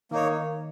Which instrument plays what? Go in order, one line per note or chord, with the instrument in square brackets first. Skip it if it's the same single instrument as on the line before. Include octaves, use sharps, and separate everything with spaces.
[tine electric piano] D#3 [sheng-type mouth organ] A#3 D#4 C#5